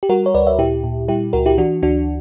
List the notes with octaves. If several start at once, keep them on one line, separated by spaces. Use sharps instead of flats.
G4
G3 F#4 A#4
C#5
D2 B4 D5
C#5 E5
A#2 E4 G4
A#2
G3 E4 G4
C#2 F#4 A#4
E4 G4
E3 D4 F#4
D2 D4 F#4